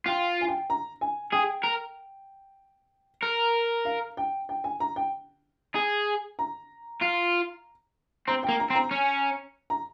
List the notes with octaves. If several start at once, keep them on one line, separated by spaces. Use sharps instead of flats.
F4 G5
G#5
G5
A#5
G#5
G#4 G5
A#4
A#4
F5
G5
G5
G#5
A#5
G5
G#4
A#5
F4
C4 A#5
G5
A#3
A#5
C4
A#5
C#4
A#5